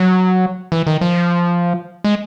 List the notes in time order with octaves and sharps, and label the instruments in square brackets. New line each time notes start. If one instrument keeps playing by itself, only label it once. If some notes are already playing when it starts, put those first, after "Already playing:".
Already playing: [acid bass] F#3
E3
D#3
F3
G#3